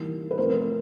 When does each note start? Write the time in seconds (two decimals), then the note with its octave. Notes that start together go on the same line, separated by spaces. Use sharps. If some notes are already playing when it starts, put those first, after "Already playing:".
Already playing: E3 G3 A#3 D#4
0.31 B4
0.38 F3 A3 C4 A#4 C5